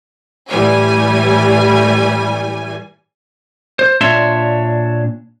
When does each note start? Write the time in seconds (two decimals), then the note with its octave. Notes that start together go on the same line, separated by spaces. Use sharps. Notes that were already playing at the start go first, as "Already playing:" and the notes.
0.49 A2 E3 G3 G#5
3.79 C5
4.01 A#2 D4 C#5 E5 C6